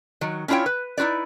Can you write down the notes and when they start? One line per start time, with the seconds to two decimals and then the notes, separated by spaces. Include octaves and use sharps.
0.21 D#3 F#3
0.48 C#4 D4 E4 F4 C#5 G5
0.66 B4
0.98 D#4 E4 F#4 B4 D5